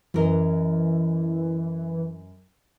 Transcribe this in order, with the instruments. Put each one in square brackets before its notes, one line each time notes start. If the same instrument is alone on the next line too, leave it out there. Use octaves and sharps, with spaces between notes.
[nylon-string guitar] F#2 A#4 D#5 [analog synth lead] E3